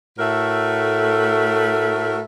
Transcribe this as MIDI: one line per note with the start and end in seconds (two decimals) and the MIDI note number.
0.19 2.20 45
0.19 2.20 57
0.19 2.20 66
0.19 2.20 70
0.19 2.20 76